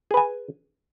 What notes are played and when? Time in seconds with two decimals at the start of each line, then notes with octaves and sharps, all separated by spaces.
0.11 G#4
0.14 B4
0.17 G#5